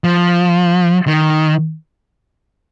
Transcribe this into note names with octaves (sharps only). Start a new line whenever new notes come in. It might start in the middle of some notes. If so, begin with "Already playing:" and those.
F3
D#3